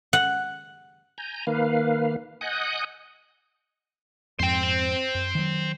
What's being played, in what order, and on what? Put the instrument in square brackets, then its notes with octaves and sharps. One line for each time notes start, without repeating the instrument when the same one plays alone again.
[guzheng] F#5
[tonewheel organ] G#5 A#5 G6
D#3 A#3 B4 F5
D#5 F#5 G#5 D#6 F#6 G6
[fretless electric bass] F2 G#2 [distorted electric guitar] C5 G5
[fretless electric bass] F#2
D#3 F#3